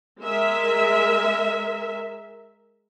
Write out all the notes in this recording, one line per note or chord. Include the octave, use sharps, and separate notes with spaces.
G#3 A#4 E5